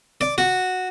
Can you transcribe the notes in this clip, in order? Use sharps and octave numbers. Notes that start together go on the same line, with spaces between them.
D5
F#4